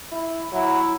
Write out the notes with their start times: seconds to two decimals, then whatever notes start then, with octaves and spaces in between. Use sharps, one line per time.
0.12 E4
0.52 F#3 E4